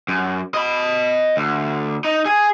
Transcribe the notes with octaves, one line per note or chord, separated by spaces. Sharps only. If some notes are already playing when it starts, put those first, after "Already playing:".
F#2
D#5 B5
D2
D#4
G#4 G#5